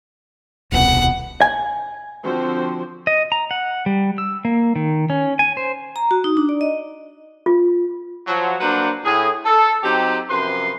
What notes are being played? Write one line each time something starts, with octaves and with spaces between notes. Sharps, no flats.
D#1 C2 B2 F#5
G#5
D3 F3 C4 F#4 C5
D#5
A#5
F#5
G3
E6
A#3
D#3
C#4
G#5
C5
A#5
F#4
D#4
D4
D5
D#5
F4
F3 F#3
F#3 A#3 D4 B4 C5 F#5
A2 G#4
A4
F#3 C4 D#4 G4
F#2 C3 F3 B4 C6